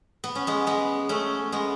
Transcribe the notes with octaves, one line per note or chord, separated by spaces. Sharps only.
B3
C#4
G#3 B3
G#3 B3
A3 C#4
G#3 B3